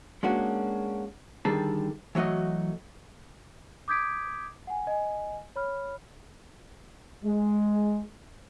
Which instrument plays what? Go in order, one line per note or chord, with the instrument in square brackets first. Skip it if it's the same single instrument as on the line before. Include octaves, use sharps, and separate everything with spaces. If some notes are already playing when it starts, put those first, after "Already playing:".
[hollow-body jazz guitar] G#3 A#3 C#4 D4 F#4
D3 D#3 G3 G#4 A4
E3 F#3 A3 F#4 D#5
[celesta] D6 D#6 G6 G#6 B6 D7
F#5 G#5
D#5 G#5
C#5 B5 F6
[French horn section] G#3